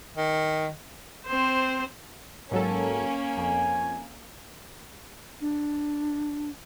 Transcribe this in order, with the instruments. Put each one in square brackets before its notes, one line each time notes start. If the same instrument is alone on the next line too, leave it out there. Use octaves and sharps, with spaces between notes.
[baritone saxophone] D#3
[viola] C4 C5
[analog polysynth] G#2 F#3 A4 [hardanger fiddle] A#3 [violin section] C#4 [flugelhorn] A#4
[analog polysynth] F2 [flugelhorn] G#5
[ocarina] D4